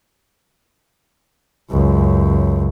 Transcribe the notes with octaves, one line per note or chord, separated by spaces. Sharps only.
C#2 F#2